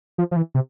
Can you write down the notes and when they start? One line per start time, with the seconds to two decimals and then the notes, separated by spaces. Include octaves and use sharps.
0.18 F3
0.31 F3
0.36 E3
0.54 C3